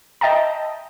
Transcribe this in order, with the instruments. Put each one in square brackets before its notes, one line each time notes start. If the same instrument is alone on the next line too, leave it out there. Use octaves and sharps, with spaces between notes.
[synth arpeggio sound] D#5 E5 G5 A5 A#5